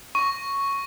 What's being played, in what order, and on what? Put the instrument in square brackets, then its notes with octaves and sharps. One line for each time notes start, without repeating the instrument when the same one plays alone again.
[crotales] C#6